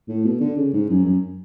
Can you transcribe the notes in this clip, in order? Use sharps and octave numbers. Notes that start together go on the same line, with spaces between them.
A2
B2
D3
C#3
G#2
F#2
F#2